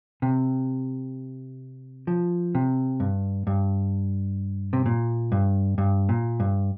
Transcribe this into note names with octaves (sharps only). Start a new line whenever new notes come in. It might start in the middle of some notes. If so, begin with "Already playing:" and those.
C3
F3
C3
G2
G2
C3
A#2
G2
G2
A#2
G2